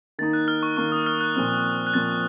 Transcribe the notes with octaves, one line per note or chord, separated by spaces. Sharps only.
D#3 A#3 D#4 A6
F#6
F6
C#6
D#3 A#3 D#4 C#6
D#6
F6
F#6
A#2 F3 C4
F#6
A#2 F3 C4 A6